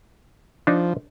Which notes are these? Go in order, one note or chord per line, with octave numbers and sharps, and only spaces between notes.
F3 D4 D#4